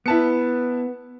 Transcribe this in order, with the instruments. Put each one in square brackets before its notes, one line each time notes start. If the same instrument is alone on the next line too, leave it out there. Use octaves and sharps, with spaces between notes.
[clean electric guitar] B3 B4 [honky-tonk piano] E4 A5 C#7